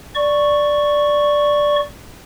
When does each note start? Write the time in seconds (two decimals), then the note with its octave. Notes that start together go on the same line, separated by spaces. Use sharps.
0.15 D5 C#6